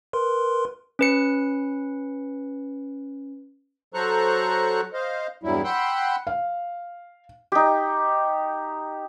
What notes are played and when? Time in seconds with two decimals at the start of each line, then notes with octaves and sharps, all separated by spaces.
0.13 A#4 B4 C6
0.99 C#4 B4 C#7
3.94 F#3 A4 C5 A#5 C#6 F#6
4.93 C5 D#5 F5
5.43 E2 G2 F#3 G3 E4
5.64 F#5 G5 B5 C6 E6 F#6
6.27 F5
7.52 D#4 G4